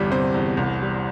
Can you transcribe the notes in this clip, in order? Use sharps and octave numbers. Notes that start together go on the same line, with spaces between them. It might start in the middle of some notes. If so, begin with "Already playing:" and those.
Already playing: G1 E2 G3
C3 C5
E2
C2
G3